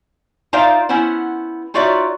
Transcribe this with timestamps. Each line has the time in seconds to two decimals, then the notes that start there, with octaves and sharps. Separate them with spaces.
0.53 D#4 F4 C5 D5 E5 F5
0.89 B3 C#4 E4 C5 F#5
1.74 D#4 F4 F#4 C#5 D5 E5